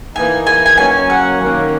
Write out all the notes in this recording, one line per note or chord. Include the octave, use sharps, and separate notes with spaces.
E3 A#3 D#4 G#5
G#5
G#5
F#3 A#3 C#4 G#5
F#5
D#3 A#3 C#4